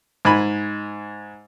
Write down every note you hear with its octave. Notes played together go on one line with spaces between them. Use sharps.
G#2 G#5 B5